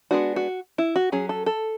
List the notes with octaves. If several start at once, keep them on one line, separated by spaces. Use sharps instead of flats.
G#3 B3 D4 F#4
F#4
E4
F#4
F#3 C#4 G#4
A4
A4